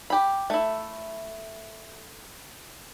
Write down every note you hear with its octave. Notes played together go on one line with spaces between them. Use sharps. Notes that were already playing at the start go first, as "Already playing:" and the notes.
G4 B5
A3 E4